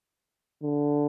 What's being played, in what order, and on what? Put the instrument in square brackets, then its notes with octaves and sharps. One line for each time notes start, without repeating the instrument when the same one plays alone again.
[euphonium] D3